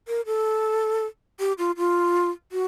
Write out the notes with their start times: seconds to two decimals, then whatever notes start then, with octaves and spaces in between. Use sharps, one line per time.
0.08 A#4
0.26 A4
1.40 G4
1.58 F4
1.77 F4
2.52 F#4